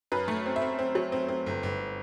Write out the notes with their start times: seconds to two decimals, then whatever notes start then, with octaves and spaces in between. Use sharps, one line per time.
0.12 F#2 B4
0.28 A3
0.46 C4
0.56 E5
0.62 C4
0.79 C4
0.95 F#3
1.12 C4
1.28 C4
1.46 G1
1.63 G1